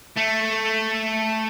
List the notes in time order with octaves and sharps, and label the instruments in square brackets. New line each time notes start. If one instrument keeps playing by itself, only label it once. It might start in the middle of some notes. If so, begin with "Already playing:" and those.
[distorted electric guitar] A3